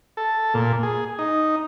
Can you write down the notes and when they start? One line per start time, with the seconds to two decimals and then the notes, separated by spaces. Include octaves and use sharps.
0.17 A4
0.54 A#2
0.83 G#4
1.19 D#4